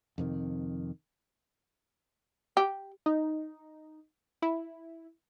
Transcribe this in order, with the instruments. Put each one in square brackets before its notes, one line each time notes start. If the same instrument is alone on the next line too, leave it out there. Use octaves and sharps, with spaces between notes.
[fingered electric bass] F2 C3 D#3
[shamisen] G4
[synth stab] D#4
E4